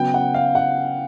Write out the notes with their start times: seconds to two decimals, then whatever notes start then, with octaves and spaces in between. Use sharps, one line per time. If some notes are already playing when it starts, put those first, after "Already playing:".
Already playing: C#3 F#3 B3 G5
0.14 F#5
0.34 F5
0.55 F#5